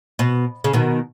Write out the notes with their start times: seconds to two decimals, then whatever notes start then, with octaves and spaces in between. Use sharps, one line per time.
0.19 B2
0.64 C#3
0.73 B2 D#3